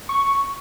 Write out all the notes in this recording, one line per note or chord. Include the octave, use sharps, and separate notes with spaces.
C#6